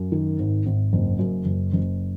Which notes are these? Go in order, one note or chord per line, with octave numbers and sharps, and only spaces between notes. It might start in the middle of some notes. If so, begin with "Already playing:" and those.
Already playing: F#2
D#3
G#1
G#1
F#1
F#2
F#1
F#1